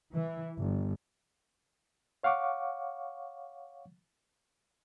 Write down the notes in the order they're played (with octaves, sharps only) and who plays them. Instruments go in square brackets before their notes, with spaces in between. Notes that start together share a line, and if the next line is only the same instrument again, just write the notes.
[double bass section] E3
G1
[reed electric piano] C#5 F5 F#5 C#6 D6